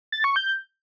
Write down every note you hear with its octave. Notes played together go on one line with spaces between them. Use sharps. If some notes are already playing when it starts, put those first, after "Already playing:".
A6
C#6
G6